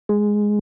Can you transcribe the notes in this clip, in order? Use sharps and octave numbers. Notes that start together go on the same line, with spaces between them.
G#3